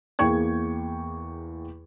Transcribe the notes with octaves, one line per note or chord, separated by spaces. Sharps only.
E2 A#3 G#4 G5 C#6 G#6